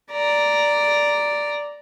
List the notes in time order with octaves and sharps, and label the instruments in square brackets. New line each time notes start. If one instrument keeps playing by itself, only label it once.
[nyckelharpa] D5 A#5